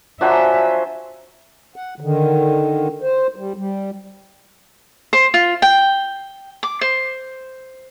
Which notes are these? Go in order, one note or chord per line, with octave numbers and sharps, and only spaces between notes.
F3 F#3 D4 C5 E5 F#5 G#5
F#5
D3 D#3
C5
G3
G3
C5
F4
G5
D6
C5